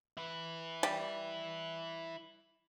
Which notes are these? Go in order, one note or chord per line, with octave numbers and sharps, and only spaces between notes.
E4 B4
G3